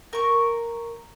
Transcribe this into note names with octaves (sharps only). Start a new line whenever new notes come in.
A#4 C#6